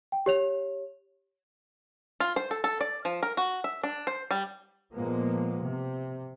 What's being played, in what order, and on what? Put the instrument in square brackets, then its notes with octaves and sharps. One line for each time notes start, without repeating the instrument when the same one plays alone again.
[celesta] G5
G4 C#5 F7
[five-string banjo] F4
C5
A4
A4
D5
F3
A#4
F#4
E5
D4
C5
G3
[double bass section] A#2 F3 G#3 A#3 B3
C3